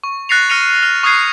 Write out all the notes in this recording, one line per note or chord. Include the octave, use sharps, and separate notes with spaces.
C#6
F#6 A6 A#6 C7 C#7 F7
F6 A#6 C#7 D#7 F7
F6 F7
C#6 D#6 F6 F#6 G#6 C7